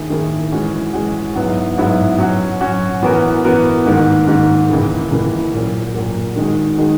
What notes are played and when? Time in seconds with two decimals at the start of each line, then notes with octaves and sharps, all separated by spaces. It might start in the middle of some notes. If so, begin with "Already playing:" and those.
Already playing: D#3 A#3 E4 G#4
0.10 D#3 A#3 E4 G#4
0.52 E3 G#3 C#4 F#4
0.93 E3 G#3 C#4 F#4
1.35 G#2 F#3 B3 E4
1.77 G#2 F#3 B3 E4
2.18 F#3 C#4 F#4
2.61 F#3 C#4 F#4
3.02 E3 B3 F#4 A#4
3.45 E3 B3 F#4 A#4
3.86 G#2 D#3 A#3
4.27 G#2 D#3 A#3
4.70 C#2 C#3 E3 A#3
5.12 C#2 C#3 E3 A#3
5.53 A#2 F#3 A#3
5.94 A#2 F#3 A#3
6.36 D#3 G#3 D#4 F#4
6.78 D#3 G#3 D#4 F#4